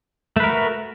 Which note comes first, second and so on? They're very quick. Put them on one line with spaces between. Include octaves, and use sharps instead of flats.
A3 B4 A#4 F#4